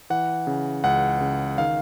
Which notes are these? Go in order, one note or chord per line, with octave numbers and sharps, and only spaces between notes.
E3 F#5
C#3
C#2 F#5
C#3
D#3 F5